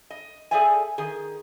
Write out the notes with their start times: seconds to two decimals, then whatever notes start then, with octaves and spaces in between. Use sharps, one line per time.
0.10 D#5
0.51 G#4 A4 C5 D5 E5 G#5
0.98 D#3 G#4